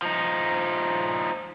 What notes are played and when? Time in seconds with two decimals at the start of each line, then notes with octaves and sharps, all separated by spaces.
0.02 F3 D#4